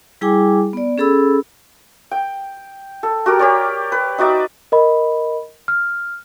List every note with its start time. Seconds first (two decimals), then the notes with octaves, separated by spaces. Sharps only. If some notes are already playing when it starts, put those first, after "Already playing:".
0.21 G3 E4 G#4 G5 G#5 D6
0.73 B3 D5
0.98 C#4 G#4 A4 B5 E6
2.11 G5
3.03 A4
3.26 F#4 G4 A#4
3.39 G4 C#5 D5
3.92 B4
4.18 D#4 F#4 D5 E5
4.72 A#4 D#5 B5
5.68 F6